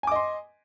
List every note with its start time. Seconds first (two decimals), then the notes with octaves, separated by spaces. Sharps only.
0.03 G#5
0.07 D6
0.12 D#5
0.16 C6